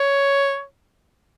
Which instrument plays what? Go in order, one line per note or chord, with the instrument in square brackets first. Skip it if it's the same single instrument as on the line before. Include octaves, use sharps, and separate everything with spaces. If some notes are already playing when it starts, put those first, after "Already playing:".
Already playing: [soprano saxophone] C#5